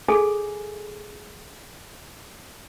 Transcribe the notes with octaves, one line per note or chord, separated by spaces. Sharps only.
G#4 A4 G#5